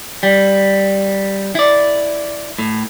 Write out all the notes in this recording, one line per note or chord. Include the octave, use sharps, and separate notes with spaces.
G3
E4 D5
A2